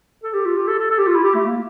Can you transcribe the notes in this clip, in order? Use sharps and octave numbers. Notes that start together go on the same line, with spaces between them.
A4
G4
F4
G4
A4
A4
A4
G4
F4
E4
G4
A3
A#3